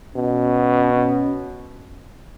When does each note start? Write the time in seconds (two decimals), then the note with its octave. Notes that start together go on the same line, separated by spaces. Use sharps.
0.16 B2 C#4
0.93 C#4